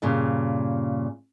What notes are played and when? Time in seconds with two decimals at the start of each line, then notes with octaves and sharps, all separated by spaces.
0.02 G2 A#2 C#3